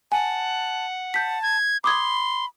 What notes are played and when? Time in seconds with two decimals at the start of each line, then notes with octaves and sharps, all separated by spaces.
0.12 F#5 G#5 A5
1.14 A5 G6 B6
1.43 G#6
1.84 B5 C6 D6 D#6 G#6